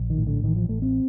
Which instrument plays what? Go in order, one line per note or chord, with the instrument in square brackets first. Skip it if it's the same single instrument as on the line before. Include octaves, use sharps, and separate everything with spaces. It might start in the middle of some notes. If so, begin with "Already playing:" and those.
Already playing: [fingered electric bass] A#1
D#3
A2
D3
A1 D#3
F3
A1 A3
C4